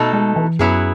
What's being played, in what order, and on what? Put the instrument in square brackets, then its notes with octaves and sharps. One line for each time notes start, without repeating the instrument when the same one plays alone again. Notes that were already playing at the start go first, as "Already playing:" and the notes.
Already playing: [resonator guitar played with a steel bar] B2 A3 D#4 A4
[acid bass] G#3
E3
[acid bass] F#2 [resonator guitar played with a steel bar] F#3 B3 E4 G#4